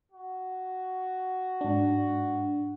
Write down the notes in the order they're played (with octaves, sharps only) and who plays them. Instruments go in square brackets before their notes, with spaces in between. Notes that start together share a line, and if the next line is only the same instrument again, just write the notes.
[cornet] F#4
[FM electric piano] G#2 D4